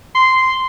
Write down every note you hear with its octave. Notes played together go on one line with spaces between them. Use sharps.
C6